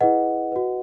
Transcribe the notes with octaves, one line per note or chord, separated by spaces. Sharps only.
E4 G#4 B4 D#5 F#5
F#4 B4